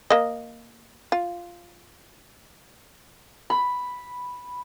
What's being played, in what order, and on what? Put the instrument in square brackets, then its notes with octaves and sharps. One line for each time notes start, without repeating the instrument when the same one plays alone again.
[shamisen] A#3 D#5
F4
[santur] B5